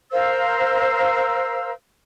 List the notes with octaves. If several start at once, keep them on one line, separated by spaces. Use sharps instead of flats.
A#4 C5 F5 E6